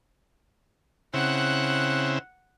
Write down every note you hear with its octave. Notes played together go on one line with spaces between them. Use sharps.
C#3 C4 E4 F#5 F#6